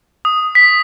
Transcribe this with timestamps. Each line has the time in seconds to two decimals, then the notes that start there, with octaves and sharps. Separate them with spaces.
0.25 D#6
0.55 B6